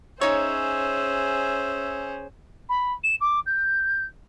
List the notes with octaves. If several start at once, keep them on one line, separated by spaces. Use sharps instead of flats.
C#4 D#4 G#4 C5 C#5 E5
B5
E7
D6
G6